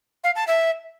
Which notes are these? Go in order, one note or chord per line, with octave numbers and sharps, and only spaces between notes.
F5
A5
E5